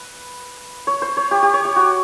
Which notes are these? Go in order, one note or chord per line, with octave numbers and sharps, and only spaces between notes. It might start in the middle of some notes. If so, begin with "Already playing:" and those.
Already playing: B4
C#5
C5
C#5
G4
G4
C#5
G4
F#4